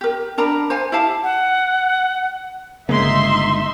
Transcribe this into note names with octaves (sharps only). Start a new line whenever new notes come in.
G4 A#4
D4 A#4 A#5 B5
C5 F5 G#5
E4 G4 F5 A5
F#5
G1 C#3 G#3 A#3 D#4 E5 C6